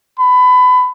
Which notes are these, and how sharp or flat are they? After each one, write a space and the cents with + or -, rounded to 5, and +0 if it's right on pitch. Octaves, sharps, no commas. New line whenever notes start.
B5 +25